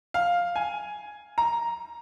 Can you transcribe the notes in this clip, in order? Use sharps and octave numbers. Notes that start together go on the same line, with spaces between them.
F5
G#5
A#5